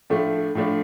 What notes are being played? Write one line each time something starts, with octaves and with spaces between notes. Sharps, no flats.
A2 F3 A3 D4
A2 F3 A3 D4